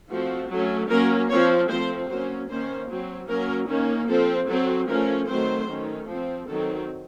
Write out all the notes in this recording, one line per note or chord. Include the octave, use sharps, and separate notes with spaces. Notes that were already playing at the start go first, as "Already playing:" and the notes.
F3 A3 C4 F#4
F#3 A3 C#4
F#3 A#3 C#4 A#4
F3 C4 C#5
F3 A3 C4 C5
F#3 A#3 C#4 C5
D#3 A#3 C#4 C5
F#3 C4
F#3 A#3 C#4 A#4
D#3 A#3 C#4
F3 C4 A4
F#3 C4 A4
F3 A3 C#4 A#4
D#3 F#3 A3 C4 C5
D#3 A3 C#4
F3 C4
D#3 F#3 C4 A4